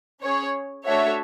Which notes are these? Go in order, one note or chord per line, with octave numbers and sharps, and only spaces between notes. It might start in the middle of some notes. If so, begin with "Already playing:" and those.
C#4 G#4 C#5
A3 D4 F#4 A4 C#5 E5